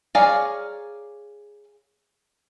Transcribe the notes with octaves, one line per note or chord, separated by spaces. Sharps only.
G#4 A#4 C#5 D5 F5